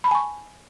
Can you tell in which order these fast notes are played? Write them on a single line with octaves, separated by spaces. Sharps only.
B5 A5 G#5 C#6